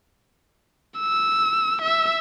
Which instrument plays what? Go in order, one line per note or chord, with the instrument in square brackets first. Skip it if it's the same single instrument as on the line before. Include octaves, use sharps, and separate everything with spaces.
[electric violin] E6
E5 E6